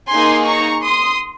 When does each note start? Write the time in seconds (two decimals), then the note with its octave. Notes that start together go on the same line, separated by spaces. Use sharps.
0.11 A#3 D#4 G#4 G#5 C6
0.48 A#5 C#6
0.85 C6 D#6